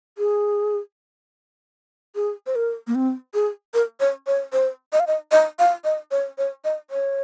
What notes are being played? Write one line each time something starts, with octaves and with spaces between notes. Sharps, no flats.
G#4
G#4
C5
A#4
A#3
C4
G#4
A#4
C#5
C#5
C5
D#5
F5
D#5
D#5
F5
D#5
C#5
C#5
D#5
C#5